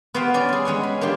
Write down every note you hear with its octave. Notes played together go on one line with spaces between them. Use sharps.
B3 F#4 G4 C5 F5 G5
C#4 D5
G3 G#4
G#3 C#4 F#5 G#5
B5
A#3 D4 F4 G4